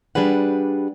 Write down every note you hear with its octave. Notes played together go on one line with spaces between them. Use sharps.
G3 D4 G#4 B4 F#5